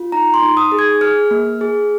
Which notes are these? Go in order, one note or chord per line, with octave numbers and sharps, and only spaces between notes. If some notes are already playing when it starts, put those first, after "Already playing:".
Already playing: F4
D#4 A#5
C6
D#4
D#6
G#4
G#6
G#4 F6
A#3
G#4